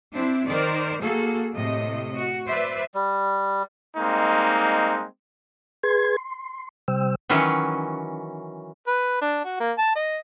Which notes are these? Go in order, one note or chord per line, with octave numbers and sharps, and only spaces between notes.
C4 D4 E4
D#3 A#4 C5 D5
A#3 F#4 G#4 A4
A2 C3 A3 D#5
F#4
B4 C5 D5 E5
G3
G3 G#3 A#3 C4 D#4
G#4 B4 C6 G#6
C6
C3 G3 C5 G5 E6
D#3 E3 F#3 C#4
B4
D4
F#4
A#3
A5
D#5